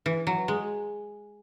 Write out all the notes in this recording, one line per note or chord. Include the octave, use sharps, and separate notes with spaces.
E3
F#3
G#3